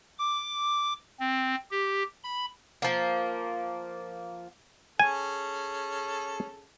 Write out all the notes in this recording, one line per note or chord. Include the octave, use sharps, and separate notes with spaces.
D6
C4
G4
B5
F3 A#3
C#4 G#4 A4 G#5